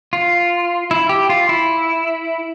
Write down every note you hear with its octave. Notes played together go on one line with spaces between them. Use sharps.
F4
E4
G4
F4
E4